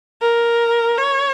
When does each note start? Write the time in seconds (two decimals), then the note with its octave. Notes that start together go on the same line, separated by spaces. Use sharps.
0.22 A#4
0.98 C#5